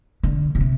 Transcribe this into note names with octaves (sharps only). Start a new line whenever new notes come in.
D3
A#2
C3